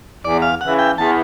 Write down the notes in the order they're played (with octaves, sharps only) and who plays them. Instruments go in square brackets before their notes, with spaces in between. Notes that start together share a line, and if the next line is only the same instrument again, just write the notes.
[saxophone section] E2 [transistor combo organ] D5
[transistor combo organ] F5
[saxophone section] C#3 E3 [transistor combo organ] F#5
[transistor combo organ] G5
[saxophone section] E2 [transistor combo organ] A5